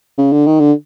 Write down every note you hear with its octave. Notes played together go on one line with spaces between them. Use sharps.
C#3
D3
D#3
D3